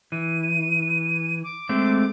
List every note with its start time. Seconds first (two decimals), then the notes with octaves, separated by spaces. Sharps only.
0.12 E3 D#7
1.43 D6
1.69 G#3 A3 C4